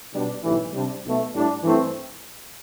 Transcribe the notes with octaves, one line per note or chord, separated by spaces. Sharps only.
B2 G3 D4
B1 A2 E3 G3
C3 G3 D4
B1 B2 A3
A2 G3 D4
G2 E3 A3 C4